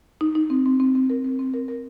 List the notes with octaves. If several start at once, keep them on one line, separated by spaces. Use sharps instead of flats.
D#4
D#4
C4
C4
C4
C4
A#4
C4
C4
A#4
A#4